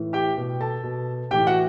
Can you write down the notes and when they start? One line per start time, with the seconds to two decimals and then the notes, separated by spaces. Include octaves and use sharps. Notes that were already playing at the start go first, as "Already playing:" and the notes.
Already playing: A2 E3
0.13 G4 G5
0.37 B2
0.60 A4 A5
0.83 B2
1.31 A2 E3 G4 G5
1.47 F#4 F#5